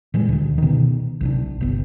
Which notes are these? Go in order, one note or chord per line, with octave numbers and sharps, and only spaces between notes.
A#2 E3 G3 G#3
D2 D3
B2 D#3
B1 C3 D4
G1 B3